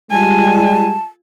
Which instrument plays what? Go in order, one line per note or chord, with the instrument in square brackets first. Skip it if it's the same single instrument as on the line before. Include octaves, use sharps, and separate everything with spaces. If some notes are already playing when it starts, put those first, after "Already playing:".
[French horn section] G3 G#3 [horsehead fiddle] F4 G#5 [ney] A5